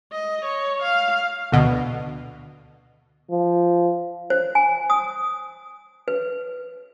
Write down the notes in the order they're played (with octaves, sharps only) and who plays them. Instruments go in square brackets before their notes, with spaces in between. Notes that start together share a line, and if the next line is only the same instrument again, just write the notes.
[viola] D#5
C#5
F5
[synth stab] D2 B2 D3
[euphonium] F3
[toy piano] C5
G#5
D#6
B4